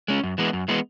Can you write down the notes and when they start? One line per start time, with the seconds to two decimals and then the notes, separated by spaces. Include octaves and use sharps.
0.08 G#3 C#4
0.23 F#2
0.38 E3 G#3 B3
0.53 F#2
0.68 E3 G#3 B3